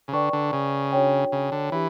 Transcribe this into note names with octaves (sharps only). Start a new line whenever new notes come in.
C#3
D3 B4 D5 G5 C#6
D3
C#3
D4 F#4 C#5 G5
C#3
D3
E3 D4 G4